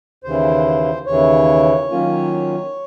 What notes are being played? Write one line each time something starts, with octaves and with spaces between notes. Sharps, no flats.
D#2 C#3 E3 C5
D#2 C#3 E3 C#5
D#3 F#3 A#3 C#4 F4